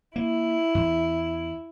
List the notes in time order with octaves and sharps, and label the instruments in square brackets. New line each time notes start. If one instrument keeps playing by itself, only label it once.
[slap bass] A#3 [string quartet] E4
[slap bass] E2